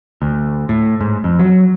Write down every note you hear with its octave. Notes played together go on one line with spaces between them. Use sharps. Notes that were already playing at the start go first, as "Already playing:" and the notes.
D2
A2
G#2
F2
F#3